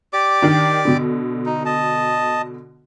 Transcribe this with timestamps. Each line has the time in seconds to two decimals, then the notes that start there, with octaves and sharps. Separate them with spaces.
0.13 G4 D5 D6
0.42 D#3 D4
0.85 B2 D3
1.46 D#4
1.66 D#5 A5